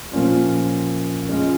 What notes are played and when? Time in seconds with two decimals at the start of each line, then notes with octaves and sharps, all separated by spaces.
0.12 A#2 F3 A#3 C#4 F4
1.29 G#3 C#4 F4 G#4